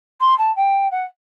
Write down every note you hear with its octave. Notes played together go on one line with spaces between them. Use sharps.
C6
A5
G5
F#5